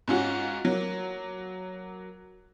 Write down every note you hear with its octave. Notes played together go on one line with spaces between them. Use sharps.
G#2 C#4 F4 F#4
F#3 A#3